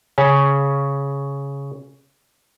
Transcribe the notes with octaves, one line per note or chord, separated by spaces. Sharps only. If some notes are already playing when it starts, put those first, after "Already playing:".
C#3 C#4